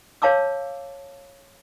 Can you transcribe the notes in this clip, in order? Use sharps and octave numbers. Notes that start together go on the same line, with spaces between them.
C#5 F5 A5 D6 E6